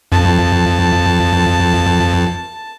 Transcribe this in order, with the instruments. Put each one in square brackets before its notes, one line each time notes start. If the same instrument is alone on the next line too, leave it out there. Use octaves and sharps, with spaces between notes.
[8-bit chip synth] F2 [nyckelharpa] A5